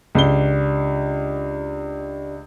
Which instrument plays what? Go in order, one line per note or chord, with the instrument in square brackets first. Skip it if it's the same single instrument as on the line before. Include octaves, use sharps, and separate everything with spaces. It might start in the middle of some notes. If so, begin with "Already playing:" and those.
[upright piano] C#2 G7 [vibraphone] D4 G4 D5